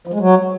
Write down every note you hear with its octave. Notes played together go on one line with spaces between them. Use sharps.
F3
G#3
F#3